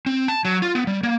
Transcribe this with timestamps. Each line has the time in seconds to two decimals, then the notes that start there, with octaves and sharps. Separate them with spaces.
0.06 C4
0.28 A5
0.45 F#3
0.62 F4
0.75 B3
0.87 G3
1.03 A#3